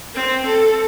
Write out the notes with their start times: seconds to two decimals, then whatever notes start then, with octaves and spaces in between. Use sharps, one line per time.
0.14 C4
0.45 A4